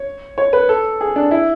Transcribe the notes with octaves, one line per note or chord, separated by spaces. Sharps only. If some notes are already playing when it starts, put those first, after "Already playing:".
Already playing: C#5
C#5
B4
A4
G#4
D4
E4